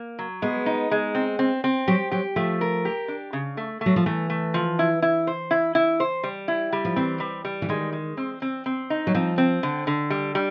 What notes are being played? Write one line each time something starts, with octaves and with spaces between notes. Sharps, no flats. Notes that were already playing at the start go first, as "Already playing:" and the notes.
Already playing: A#3
F#3
G#3 B3
D#4
G#3
C4
C4
C4
F#3 G4
F#3 G4
F3 A3
A#4
G4
D4
C#3
A3
A3
F#3
F3
E3 A3
A3
F3
E4
E4
C5
E4
E4
C5
G3
E4
G3
F3
E3 C4
G3
G3
E3
D#3 G#3
G#3
C4
C4
C4
D#4
F#3
F3 C4
C4
D3
D3
G3
G3